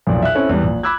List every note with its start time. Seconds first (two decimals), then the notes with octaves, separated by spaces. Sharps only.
0.07 B1 F2 A#2 D5
0.22 E5 F#6
0.35 C4 C#4 E4 A4 C#5
0.49 E2 G3
0.64 A#1
0.83 B5 D6 E6 F#6 G#6